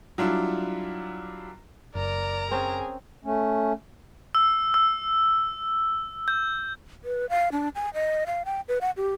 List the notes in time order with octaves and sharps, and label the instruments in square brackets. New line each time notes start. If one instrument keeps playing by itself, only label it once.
[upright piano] F#3 G3 D4 E4 F4
[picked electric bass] F#1 [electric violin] A#4 A#5 [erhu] D5
[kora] C4 C#4 [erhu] G#4
[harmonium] A3 C#4
[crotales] E6
E6
G6
[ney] B4
F5
D4
G#5
D#5
F5
G5
B4
F#5
G4